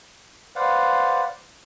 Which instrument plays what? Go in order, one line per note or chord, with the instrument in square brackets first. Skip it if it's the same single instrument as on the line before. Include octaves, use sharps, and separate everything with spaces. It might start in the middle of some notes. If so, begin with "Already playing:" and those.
[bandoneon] B4 C5 D5 F5 F#5